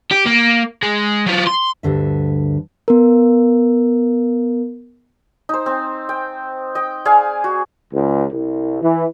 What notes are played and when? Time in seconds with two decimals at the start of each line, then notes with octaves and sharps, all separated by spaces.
0.11 G4
0.26 A#3
0.83 G#3
1.26 F#3 F4
1.47 C6
1.83 D2 G2 D3 E5
2.88 B3 A#4
5.49 D#4 C5
5.66 C4
6.09 G5
6.75 D#5 G5
7.05 G#4 D5 F5 G#5
7.44 F#4
7.92 C#2
8.31 C2
8.81 E3